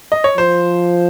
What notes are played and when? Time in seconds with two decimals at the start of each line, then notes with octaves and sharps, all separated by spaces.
0.12 D#5
0.24 C#5
0.37 F3 C5